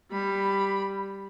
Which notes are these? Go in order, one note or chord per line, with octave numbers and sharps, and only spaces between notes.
G3 B5